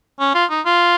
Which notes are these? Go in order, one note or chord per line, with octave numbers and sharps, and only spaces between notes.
C#4
F4
D#4
F4